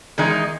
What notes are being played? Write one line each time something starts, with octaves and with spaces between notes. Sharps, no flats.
E2 D#3 G#3 D#4